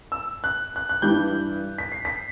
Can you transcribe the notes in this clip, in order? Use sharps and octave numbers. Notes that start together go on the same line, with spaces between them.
E6
F#6
F#6
F#6
G2 E3 G3 D4 G6
B6
C7
B6